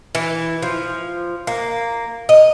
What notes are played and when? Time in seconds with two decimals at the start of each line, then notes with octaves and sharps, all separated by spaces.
0.15 E3
0.62 F3
1.47 A#3
2.29 D#5